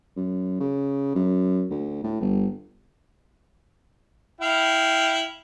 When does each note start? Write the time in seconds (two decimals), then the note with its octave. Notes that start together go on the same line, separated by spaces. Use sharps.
0.16 F#2
0.60 C#3
1.15 F#2
1.70 D2
2.04 A2
2.20 G1
4.41 E4 F5 G5